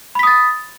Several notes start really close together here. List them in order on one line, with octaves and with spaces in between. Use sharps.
B5 B6 D#6 A6